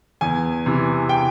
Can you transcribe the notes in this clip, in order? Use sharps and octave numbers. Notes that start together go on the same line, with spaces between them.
E2 G#5
C3 E3
G5